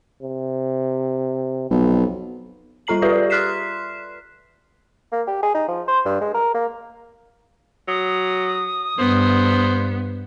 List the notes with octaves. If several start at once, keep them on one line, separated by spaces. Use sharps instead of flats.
C3
B1 F2
G3 F4 A4 A#5 C7 F#7
F4 G4 B4 D5 E5
C6 F6 F#6 B6 C7 E7
A#3
G4
G#4
D#4
F3
C5
G2
G#3
A#4
A#3
F#3 D#6
G2 B3 C5